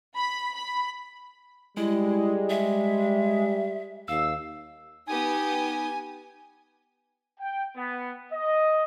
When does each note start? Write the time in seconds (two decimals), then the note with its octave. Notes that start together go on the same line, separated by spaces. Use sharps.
0.16 B5
0.55 B5
1.77 G3 G#3 E4
2.50 E5
4.08 D#2 F5 E6
5.07 B3 D#4 G4 G#5 D#6
7.40 G5
7.76 B3
8.32 D#5